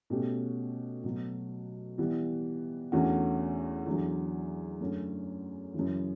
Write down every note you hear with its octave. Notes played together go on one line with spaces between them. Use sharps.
B2 A3 C#4 G4
B2 F#3 A3
E3 G3 B3
E2 D3 A3 C#4 F#4
E2 D3 F#3
F#2 D3 A3 C#4
F#2 C#3 E3